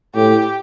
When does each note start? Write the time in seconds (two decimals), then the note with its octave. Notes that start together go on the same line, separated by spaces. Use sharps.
0.15 A2 G4